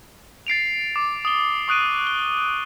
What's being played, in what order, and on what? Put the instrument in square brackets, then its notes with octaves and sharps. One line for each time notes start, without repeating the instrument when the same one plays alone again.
[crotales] A6 C7 D7 F7
D6
D#6 G7
C#6 D#6 F#6 D7 D#7
G7